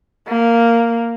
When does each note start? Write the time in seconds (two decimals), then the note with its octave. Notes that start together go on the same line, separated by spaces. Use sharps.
0.28 A#3